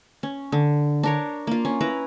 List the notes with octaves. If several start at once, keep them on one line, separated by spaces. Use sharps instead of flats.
C#4
D3
D4 A#4 C#5
A#3 F4
C#4
E4 B4 A#5